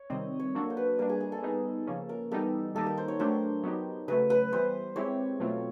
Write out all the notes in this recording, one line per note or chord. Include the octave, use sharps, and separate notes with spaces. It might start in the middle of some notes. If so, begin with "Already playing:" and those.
Already playing: C#5
C3 D#3 G3 C4 D#5
C#5
F#3 A#3 D4 F#4 A4
C5
B4
G3 A#3 D4 A#4
G#4
G#4
A4
G3 B3 D#4 G#4
C#3 F3 A#3 C#4
A#4
E3 G3 B3 D#4 G4 A4
D#3 G3 A#3 D#4 G4 A4
A#4
C5
C#5
F#3 A3 D4 G4 C5
F#3 B3 D#4 G4
C#3 F#3 A3 B4
B4
E3 G3 B3 C5
G#3 C4 E4 G4 C#5
B2 F#3 A3 C4 F4